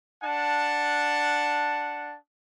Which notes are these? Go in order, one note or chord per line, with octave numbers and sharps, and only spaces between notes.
D4 F#5 A5